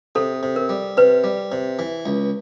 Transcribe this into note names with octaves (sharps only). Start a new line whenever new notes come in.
C3 A4
C3
A#4
G3
C3 B4
G3
C3
E3
C#2